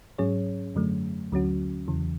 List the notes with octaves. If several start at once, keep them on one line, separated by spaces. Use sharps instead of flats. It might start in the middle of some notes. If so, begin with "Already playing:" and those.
G#2 F#3 C#4 G#4 C#5
F#2 D3 F#3 A3
D2 D3 F#3 C#4 F#4
E2 C#3 E3